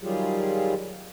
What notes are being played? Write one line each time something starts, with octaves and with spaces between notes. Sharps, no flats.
D#3 F#3 G3 F4 G4 G#4